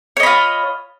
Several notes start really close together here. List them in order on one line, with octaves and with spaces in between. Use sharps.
C#5 D#5 B5 F4